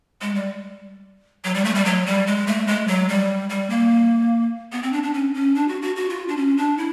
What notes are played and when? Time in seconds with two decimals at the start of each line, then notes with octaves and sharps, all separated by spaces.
0.21 G#3
0.35 G3
1.44 F#3
1.54 G3
1.65 A3
1.75 G3
1.85 F#3
2.06 G3
2.27 G#3
2.47 A3
2.67 G#3
2.87 F#3
3.09 G3
3.50 G3
3.70 A#3
4.72 B3
4.83 C4
4.92 D4
5.03 D4
5.14 C#4
5.34 C#4
5.55 D4
5.68 F#4
5.82 F#4
5.96 F#4
6.09 F4
6.28 D4
6.37 C#4
6.57 D4
6.78 E4